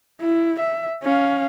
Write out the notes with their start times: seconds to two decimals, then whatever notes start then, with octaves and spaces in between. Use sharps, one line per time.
0.21 E4
0.60 E5
1.03 C#4 F5